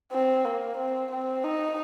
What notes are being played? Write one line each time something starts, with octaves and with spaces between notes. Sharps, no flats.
C4
A#3
C4
C4
D#4